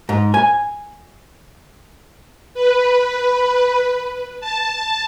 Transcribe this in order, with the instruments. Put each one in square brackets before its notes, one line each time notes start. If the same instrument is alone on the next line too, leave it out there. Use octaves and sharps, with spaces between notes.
[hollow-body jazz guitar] G#2
G#5
[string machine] B4
A5